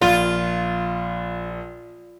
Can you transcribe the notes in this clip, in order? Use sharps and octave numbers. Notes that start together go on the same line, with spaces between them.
A#1 F4